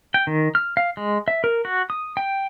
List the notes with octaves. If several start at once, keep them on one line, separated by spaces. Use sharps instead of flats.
G5
D#3
F6
F5
G#3
E5
A#4
F#4
D#6
G5